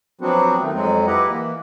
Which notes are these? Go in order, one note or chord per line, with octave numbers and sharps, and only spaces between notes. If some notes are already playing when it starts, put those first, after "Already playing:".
F3 F#3 B3 C4 D4 F#4
D#3 A3
F2 F#3 G#3 C4
E4 G4 B4 D#5 F#5 A#5
E3 A#3